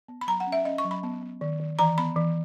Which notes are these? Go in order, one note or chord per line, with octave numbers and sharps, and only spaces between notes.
B3
B5
F#3 A#5
F#5
C#4
E5
C#4 D#5
C#6
F#3
B5
B3
B3
D#3
D#3
E3 A#5
B3 B5
E3